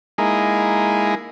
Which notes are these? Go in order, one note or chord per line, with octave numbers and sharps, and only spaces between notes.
G#3 A#3 D#4 E4 G#4